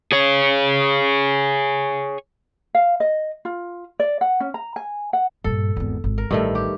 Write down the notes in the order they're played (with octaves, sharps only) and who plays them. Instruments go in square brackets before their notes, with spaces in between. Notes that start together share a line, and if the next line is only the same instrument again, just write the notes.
[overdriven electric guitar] G#4 C#5
[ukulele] F5
D#5
F4
D5
F#5
C#4
A#5
G#5
F#5
[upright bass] G2 A#2 [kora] A4
[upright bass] G#1 E2
G#1
[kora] A#4
[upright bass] A1 [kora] G2 D#3 A3
[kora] G4